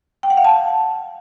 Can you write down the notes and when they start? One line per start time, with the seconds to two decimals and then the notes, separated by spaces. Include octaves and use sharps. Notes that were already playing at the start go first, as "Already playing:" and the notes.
0.23 G5
0.30 F#5
0.37 F5
0.44 A5